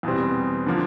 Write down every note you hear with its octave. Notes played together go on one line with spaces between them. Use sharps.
E2 B2 G3 C4
D3 F3 A#3